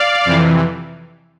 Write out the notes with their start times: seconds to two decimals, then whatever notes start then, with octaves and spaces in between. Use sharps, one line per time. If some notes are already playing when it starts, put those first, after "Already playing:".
Already playing: D5 F5
0.25 F2 C3 E3